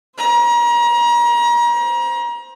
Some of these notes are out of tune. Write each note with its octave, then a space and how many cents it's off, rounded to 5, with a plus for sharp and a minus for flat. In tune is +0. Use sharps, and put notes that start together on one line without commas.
C5 +0 A#5 +35